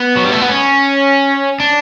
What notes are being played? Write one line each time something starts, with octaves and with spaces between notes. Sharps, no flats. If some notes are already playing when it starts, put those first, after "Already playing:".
Already playing: B3
F#3
G3
A3
B3
C#4
D4